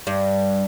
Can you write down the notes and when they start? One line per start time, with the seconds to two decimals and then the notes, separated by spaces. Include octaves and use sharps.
0.07 G2